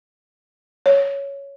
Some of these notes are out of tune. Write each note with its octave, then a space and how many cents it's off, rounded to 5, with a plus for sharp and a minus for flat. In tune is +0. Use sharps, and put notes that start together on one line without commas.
C#5 +5